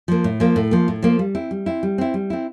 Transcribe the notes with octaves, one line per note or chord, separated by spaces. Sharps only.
F3 A#3
A2
F3 A#3
A2
F3 A#3
A2
F3 A#3
G3
C4 E4
G3
C4 E4
G3
C4 E4
G3
C4 E4